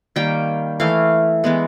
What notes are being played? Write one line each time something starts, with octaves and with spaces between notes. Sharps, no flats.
D#3 G3 A#3 G5
E3 A3 F5
E3 G#3 B3